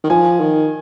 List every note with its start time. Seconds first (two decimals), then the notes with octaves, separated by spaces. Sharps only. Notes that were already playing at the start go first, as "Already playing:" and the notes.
0.04 D#3
0.10 F3 G#5
0.40 D#3